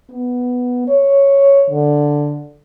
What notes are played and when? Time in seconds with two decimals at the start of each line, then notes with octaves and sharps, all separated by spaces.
0.11 B3
0.88 C#5
1.70 D3